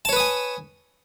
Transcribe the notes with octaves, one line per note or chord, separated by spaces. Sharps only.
B4 C#5 G#5 A5 D#6